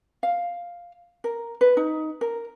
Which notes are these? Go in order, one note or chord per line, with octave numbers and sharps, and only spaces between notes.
F5
A#4
B4
D#4
A#4